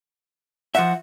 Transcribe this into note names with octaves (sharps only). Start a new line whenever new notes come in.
F3 E5 F#5